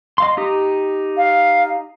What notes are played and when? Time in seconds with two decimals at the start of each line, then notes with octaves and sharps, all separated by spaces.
0.18 D#5 F5 C6
0.37 D#4 G4 D#6
1.17 F5